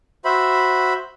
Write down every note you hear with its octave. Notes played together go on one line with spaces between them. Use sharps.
F#4 C5 E5 B5